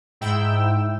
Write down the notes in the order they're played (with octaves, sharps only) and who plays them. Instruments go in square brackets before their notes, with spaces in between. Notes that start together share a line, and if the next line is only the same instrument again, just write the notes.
[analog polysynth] G#2 E4 G5 E6